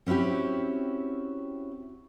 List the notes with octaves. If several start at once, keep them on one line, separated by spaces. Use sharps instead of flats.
C4 C#4 E4 F#4 G4